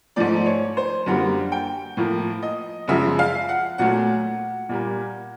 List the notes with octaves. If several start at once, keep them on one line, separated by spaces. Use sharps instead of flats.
G#2 F3 A3 D5
C#5
C5
F#2 D3 G3 A#3 F#5
G5
A2 F3 A#3
D#5
F#2 C#3 F3 G#3 E5
F5
F#5
A#2 F#3 A3 F#5
A#2 G3 A#3